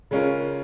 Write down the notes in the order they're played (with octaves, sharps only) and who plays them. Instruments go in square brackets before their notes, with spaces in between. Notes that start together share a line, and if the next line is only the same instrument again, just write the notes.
[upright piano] C#3 G#3 C#4 F4 A#4